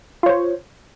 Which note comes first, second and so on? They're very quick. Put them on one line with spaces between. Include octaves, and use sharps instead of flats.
F4 C#5 C5